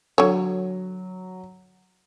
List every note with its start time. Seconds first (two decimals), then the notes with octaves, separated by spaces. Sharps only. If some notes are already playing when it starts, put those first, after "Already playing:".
0.18 D3 F#3 C#5